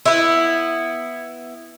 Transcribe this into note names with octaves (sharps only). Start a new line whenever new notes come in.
B3 E4